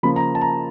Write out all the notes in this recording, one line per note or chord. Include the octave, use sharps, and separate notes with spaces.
C#3 F3 A#3 B5
A#5
A5
A#5